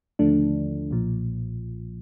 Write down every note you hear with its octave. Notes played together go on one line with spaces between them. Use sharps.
D#2 D3 F3 A3 D4
B1 A#2 F3